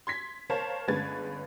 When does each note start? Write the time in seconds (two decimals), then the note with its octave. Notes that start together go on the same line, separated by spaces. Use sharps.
0.07 C6 G#6 B6
0.50 A#4 C5 C#5 F5 A5
0.88 G1 G#3 C#4 B4 G#6 A6